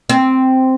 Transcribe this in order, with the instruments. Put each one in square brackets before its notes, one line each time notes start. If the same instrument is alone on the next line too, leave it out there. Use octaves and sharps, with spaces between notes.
[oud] C4